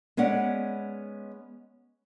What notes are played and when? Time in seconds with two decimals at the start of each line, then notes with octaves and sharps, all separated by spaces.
0.17 G#3 B3 C#4 D5 F#5